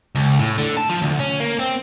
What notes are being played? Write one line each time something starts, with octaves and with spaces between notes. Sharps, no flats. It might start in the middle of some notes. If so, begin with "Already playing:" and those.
C#2
A2
D3
A5
F3
D2
C#4
A#3
C4